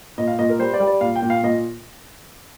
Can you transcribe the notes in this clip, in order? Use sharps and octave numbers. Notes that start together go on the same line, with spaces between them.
A#2 D#5
F5
A#2 D#5
A#4
G3 C5
D5
G3
D5
A#2 F5
G5
A#2
F5
A#2 D#5